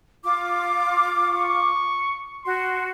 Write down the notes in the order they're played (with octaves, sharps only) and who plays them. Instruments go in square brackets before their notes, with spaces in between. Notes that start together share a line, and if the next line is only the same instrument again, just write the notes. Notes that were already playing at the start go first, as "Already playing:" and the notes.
[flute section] F4 D6
[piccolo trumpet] C#6
[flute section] F#4 [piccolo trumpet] C6